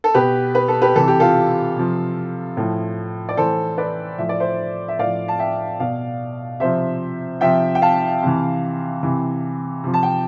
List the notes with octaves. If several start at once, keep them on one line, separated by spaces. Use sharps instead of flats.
A4
B2 G4 B4
B4
A4
G4 B4
C3 E3 A4
G4
F4 A4
C3 F3
A2 F3
D5
A2 E3 A4 C5
B4 D5
A2 F3 E5
D5
C5 E5
E5
A2 F3 D5 F5
A5
E5 G5
B2 D5 F5
C3 F3 C5 E5
C3 F3 E5 G5
G5
F5 A5
C3 E3
C3 E3
C3 F3
A5
G5